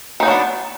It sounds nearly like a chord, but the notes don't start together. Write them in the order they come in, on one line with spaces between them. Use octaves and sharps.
D#3 D#4 F#3 D4 B3